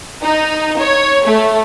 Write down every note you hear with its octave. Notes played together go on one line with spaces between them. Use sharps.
D#4
C#5
A3